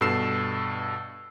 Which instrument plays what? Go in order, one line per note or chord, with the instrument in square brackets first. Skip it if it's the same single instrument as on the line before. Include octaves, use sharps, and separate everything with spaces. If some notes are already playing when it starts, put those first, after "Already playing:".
[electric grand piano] G2 B2 A4 E6 C7 E7